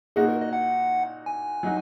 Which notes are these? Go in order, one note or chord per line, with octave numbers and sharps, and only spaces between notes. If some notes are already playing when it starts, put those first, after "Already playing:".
A#2 A#3 D#4 F#4 G#4
A#4
D#5
F#5
G#5
F#3 D#4 F#4